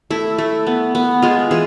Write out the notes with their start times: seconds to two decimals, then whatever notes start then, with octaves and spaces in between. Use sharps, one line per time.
0.10 A3 E4
0.38 A3
0.67 B3
0.95 B3
1.22 G#3 F4
1.51 E3 G#4